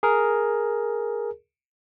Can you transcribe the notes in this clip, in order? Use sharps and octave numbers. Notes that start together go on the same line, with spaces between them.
G#4 A#4